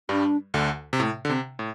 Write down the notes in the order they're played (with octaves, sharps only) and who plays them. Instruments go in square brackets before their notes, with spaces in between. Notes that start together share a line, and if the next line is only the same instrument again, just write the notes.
[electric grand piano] G2 G3 [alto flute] D4
[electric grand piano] D2 D3
C3
[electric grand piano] A2 [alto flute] A3
[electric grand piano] D3
[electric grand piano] C3 [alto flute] C4
[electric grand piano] A2